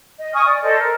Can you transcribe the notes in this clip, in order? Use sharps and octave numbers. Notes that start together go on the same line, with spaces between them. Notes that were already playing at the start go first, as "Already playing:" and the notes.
D#5
G#5 C#6 D#6 F6
D5
A4 C5 D5 D#5
A#4